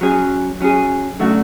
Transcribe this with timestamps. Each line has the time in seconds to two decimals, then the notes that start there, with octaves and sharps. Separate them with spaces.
0.01 F#3 C#4 G#4
0.60 F#3 C#4 G#4
1.19 C#3 F#3 A3 D4 F#4